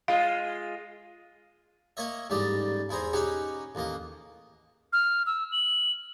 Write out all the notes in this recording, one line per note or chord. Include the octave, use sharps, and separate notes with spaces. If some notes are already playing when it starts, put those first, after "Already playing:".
G#3 F4 F5
A#3 C#5 D#5 E5
A1 G#2 G3 D5 D#5 G5
E2 E4 G#4 C5 A#5
C#4 D#4 G4 G#4 F#5
A1 D#2 A#3 D#5
F6
E6
F#7